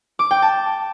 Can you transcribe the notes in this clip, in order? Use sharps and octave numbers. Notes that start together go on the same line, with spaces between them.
D6
G5
A5